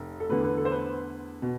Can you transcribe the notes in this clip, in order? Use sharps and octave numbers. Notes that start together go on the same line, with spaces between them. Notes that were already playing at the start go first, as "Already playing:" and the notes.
Already playing: F1
A4
E2 D3 A3 B4
B4
A4
C5
B4
B2